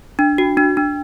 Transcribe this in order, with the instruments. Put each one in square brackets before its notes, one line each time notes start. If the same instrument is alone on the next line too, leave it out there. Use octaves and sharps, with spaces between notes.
[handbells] D4
F#4
D4
D4